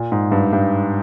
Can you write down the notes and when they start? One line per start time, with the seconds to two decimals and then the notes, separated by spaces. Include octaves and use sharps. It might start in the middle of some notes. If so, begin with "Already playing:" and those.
Already playing: A#2
0.12 G#2
0.32 G2
0.53 G2